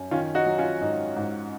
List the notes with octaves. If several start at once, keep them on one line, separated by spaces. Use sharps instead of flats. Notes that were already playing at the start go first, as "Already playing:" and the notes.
Already playing: F#2
D#3 C#4 F4
D#4 F#4
F#3
C#4 F4
G#2 D#4
G#2